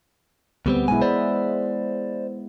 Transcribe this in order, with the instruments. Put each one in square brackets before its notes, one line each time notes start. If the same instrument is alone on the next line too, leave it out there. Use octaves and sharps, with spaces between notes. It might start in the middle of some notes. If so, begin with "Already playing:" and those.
[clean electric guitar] D2 G3 C4 [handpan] B3
[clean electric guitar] B1 G#5 [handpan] G#3 E4
[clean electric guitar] C5 D5